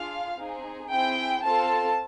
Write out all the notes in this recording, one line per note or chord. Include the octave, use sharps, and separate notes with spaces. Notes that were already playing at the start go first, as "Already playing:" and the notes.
Already playing: D4 F4 G#4 F5
C4 D#4 G#4
C4 E4 G#4 G5
C4 F4 A4 A5